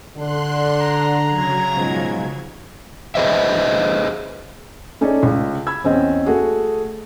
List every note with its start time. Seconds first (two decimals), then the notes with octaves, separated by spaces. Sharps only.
0.16 D3 C6 F#6
0.80 A#5
1.27 C#3 F#3 G#6
1.76 G#2 B2 F3
3.15 G#4 B4 C5 D#5 E5
5.01 A3 C#4 D#4 G#4 A4 D5
5.23 C#2
5.67 B5 E6 G#6
5.84 E2 C4 C#4 D#5
6.26 A3 F#4 G#4